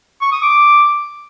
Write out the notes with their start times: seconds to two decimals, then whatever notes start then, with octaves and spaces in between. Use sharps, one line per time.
0.21 C#6
0.32 D#6
0.42 D6